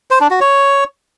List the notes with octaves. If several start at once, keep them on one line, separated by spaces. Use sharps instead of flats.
C5
D4
F#4
C#5